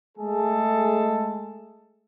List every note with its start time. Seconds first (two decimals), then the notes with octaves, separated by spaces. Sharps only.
0.18 G#3 A3 G#4 A4